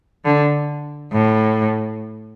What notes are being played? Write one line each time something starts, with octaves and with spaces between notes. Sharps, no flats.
D3
A2